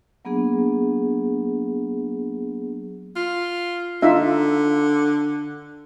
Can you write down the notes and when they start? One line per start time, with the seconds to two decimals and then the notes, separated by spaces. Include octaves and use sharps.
0.25 F#3 A#3 B3 D4 G#4
3.17 F4
4.02 D3 D#4 F4 E5